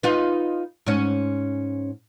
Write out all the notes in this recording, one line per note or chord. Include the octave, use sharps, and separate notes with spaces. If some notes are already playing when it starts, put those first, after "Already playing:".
D#4 F4 B4
G#2 C#4